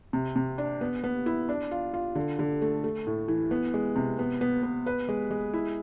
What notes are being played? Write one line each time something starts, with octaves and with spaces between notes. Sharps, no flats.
C3
C3
D4
B3
B3
E4
D4
F4
F4
D3
D3
A3
A3
A2
E3
B3
G#3
C3
B3
B3
B3
B4
G#3
G#3
E4